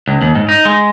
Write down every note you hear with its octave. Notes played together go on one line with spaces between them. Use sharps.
C#2
D#2
G#2
D#4
G#3